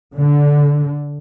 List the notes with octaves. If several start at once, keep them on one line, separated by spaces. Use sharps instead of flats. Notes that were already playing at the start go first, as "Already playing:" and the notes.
D3